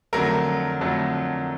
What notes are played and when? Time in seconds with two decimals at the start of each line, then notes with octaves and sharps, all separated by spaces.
0.13 F2 D3 F#3 A3 A#4
0.81 F2 D3 F#3 A3